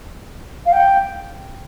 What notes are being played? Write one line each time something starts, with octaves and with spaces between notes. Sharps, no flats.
F5
G5